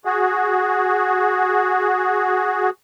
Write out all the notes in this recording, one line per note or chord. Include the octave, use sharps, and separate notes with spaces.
F#4 G#4